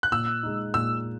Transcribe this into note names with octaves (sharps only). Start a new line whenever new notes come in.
F#6
A#2 E6
G#3 D#4
A#2 E6